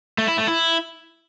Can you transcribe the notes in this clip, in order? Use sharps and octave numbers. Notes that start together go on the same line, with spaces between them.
A3
E4
A3
E4